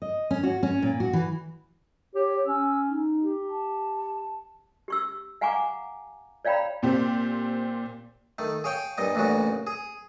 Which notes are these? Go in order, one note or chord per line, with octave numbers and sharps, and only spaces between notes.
D#5
C#4
F#4
C#4
A#2
F#4
E3
G4 C#5
C#4 E6
D#4
G4
A5
G4 C#6 E6
F5 F#5 G#5 A#5 C#6 D6
C#5 D5 F5 G5 A#5 B5
A#2 C4 G4
D#3 A3
G#4 C#5 F5 G5
G2 A#2 D#5
A1 D2 A#2 C#3 F#4
G#4